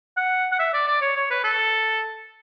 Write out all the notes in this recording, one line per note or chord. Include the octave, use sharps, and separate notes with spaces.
F#5
F#5
E5
D5
D5
C#5
C#5
B4
A4